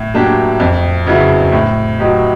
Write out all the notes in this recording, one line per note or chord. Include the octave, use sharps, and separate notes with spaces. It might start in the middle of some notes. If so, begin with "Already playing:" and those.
Already playing: A2
F#3 A#3 D4 G4
F2
C#3 F#3 B3 E4
A2
F#3 B3 D#4 G4